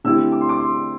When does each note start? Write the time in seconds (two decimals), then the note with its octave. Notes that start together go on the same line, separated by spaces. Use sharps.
0.04 D3 A3 C4 E4 G4 E6
0.32 D6
0.41 C6
0.49 D6
0.60 C6